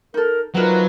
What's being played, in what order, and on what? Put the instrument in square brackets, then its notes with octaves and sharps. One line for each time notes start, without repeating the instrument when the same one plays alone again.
[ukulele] D#4 A4 [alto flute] A#4
[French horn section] D2 D#4 B4 [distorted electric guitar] F#3 [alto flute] F4 [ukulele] A#4 F#5